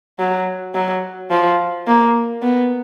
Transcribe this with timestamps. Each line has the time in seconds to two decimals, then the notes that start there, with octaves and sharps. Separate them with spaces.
0.19 F#3
0.75 F#3
1.31 F3
1.87 A#3
2.42 B3